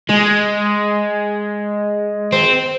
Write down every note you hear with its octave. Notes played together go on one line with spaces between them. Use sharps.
G#3
C4